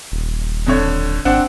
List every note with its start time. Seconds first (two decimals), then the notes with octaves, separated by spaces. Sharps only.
0.12 D#1
0.67 F2 D3 C#5
1.25 G#1 C4 D4 F#5